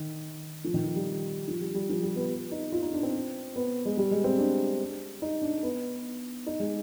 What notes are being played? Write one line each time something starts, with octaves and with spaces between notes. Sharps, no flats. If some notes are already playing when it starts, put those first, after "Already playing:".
Already playing: D#3
F3
D#3
F3
G3
F3
G3
G3
F3
G3
B3
D#4
F4
D#4
D4
C4
B3
G#3
G3
G#3
C4
D4
D#4
D4
B3
D#4
G#3